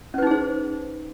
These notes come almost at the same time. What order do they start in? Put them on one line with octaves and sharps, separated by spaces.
C#4 B4 D#4 G#4 C5